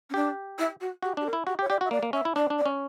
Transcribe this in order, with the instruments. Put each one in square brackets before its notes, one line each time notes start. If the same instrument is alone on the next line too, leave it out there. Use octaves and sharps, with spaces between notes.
[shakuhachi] C#4
[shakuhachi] D4 [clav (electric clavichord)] G4
[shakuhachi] E4
F#4
[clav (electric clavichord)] F#4 [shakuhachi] G4
[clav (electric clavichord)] D4 [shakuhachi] G4
[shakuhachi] A#4
[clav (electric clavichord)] E4
[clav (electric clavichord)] F#4 [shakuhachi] G4
[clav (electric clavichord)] G4
[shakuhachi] C#5
[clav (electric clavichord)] G4 [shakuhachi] D5
[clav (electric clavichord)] F#4
[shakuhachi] E5
[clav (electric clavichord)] A#3 [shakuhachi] D5
[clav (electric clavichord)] A#3
[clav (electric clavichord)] C#4 [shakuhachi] E5
[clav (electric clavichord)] E4
[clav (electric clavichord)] D4 [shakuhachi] D5
[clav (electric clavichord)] D4
[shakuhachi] D5
[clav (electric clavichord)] C#4